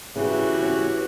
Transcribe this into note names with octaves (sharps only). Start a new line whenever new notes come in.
C#3 E3 F#4 G4
C#4